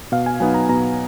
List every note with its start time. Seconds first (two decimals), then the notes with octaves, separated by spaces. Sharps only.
0.12 B2 F5
0.26 G#5
0.40 F#3 B3 D#4 G#5
0.54 A#5
0.69 B2 A#5